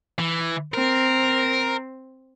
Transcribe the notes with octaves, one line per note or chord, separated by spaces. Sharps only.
E3
C4 A#4